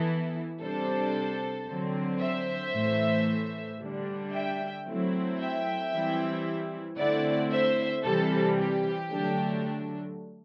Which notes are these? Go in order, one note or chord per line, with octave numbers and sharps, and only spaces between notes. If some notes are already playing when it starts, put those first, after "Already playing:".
Already playing: E3 B3 E4 A4
C3 G3 D4 A4 C5
D3 F#3 C4
C5 E5
A2 E3 A3
D3 G3 D4
E5 G5
F#3 A3 C4 E4
E5 G5
E3 G3 C4 E4
D3 A3 C4 E4 D5 F#5
C5 E5
C3 E3 G3 A4 C5
G4
D3 F#3 A3 D4